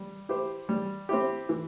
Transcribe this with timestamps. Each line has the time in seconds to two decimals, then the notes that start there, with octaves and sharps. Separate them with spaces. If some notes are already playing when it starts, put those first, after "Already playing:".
Already playing: G3
0.29 E4 G4 C5
0.69 G3
1.09 C4 E4 G4
1.49 E3